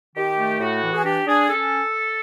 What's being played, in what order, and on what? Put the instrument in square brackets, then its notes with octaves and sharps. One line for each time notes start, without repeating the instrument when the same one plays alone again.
[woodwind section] D#3 G4
A3
A2 F#4
E3
G#4
D4 G4
D4 G#4
C#4 A4